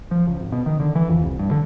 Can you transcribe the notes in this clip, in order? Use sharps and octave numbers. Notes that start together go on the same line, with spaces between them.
F3
C#2
G#1
B2
D#3
D3
E3
F2
C2
G2
D3